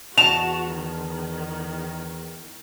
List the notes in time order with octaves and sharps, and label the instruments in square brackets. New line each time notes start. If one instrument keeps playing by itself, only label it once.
[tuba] E2 [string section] F#4 [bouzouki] A5 [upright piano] F7
[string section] D#3